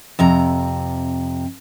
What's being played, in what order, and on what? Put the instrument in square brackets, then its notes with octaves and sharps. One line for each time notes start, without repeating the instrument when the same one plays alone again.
[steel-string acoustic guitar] F2 C3 A#5